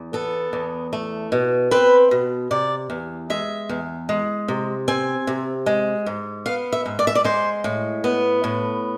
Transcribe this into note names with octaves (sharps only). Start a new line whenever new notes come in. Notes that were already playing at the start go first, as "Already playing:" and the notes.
Already playing: E2
B3 A4
E2
A3
B2
C4 B4
B2
C3 D5
E2
G#3 E5
E2
G#3
C3
C4 G#5
C3
G#3
G#2
B3 F5
E5
G#2
D5
E5
D5
G#3 C5
A2
B3
A2